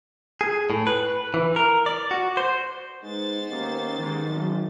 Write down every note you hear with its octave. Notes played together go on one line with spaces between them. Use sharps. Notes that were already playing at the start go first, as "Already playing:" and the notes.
G#4
A2
B4
E3
A#4
D5
F#4
C5
G#3 B3 D#4 C5 A6
D#2 C#4
G#2 D#3
G#1 F#3